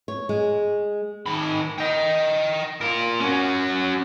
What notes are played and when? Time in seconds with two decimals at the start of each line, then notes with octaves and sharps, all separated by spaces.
0.08 C#5
0.29 G#3
1.26 D#3 B5
1.79 D#5 G5
2.81 F4 A#4
3.21 C#4 F#4